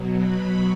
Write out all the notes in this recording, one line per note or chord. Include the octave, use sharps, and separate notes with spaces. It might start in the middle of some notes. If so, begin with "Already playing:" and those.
Already playing: B2 F#3
B5